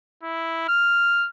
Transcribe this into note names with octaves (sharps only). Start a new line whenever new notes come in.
E4
F6